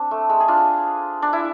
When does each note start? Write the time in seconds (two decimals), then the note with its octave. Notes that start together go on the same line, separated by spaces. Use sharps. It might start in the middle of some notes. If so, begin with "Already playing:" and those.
Already playing: C4 D4
0.11 A3
0.29 G#3
0.40 G#4
0.48 D4 F4
1.22 D4
1.33 E4